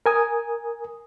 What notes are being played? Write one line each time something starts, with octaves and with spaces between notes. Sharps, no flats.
A#4 G#5 D#6